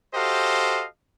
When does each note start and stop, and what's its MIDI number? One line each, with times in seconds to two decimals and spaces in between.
0.14 0.85 66
0.14 0.85 67
0.14 0.85 69
0.14 0.85 72
0.14 0.85 75
0.14 0.85 77